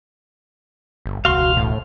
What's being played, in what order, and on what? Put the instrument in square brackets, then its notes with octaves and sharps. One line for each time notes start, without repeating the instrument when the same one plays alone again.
[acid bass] G1
[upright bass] E1 C#2 [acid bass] F#4 [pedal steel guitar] F5 C6
[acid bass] A2